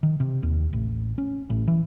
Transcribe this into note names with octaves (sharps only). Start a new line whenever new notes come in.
D#3
C3
D#2
A1
C#4
A1
E3